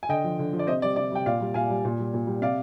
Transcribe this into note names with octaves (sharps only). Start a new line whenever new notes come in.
G#5
D3 D#5 G5
F3
D3
F3
D5
C3 C5 D#5
G3 D5
C3 D5
G3 G5
A#2 D5 F5
G3
A#2 F5 G#5
G3
A#2
G3
A#2
G3
C3 D5 F5